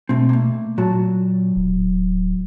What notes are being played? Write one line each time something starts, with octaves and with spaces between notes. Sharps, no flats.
B2 A3 C4
A3 A#3
A#2 F#3 F#4 A5
D1